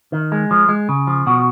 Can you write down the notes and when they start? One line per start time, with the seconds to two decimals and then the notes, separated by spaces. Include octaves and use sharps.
0.12 D#3
0.32 G#3
0.51 F3
0.69 G#3
0.89 C#3
1.07 F3
1.27 B2 F#4